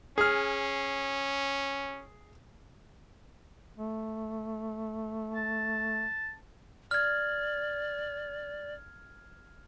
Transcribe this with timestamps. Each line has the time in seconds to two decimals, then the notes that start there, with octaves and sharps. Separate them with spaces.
0.18 C#4 G#4 F6
3.78 A3
5.34 A5
6.91 D5 F6 G#6